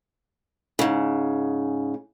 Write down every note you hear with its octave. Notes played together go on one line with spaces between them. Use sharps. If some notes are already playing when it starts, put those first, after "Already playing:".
G#2 C#3